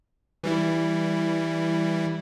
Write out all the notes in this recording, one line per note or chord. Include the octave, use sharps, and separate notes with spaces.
E3 G3 E4